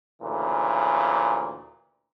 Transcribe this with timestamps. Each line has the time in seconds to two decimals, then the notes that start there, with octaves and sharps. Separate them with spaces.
0.22 D2 A#2 C#3 E3